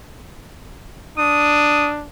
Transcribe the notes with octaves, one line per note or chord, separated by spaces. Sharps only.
D4 D#6